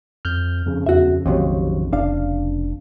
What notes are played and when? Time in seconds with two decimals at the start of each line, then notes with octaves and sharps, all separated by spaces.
0.25 F2 F6 G6
0.66 F2 C#3
0.86 E2 F#4 E5
1.26 A#1 D#2 C3 F#3
1.93 F1 D4 F5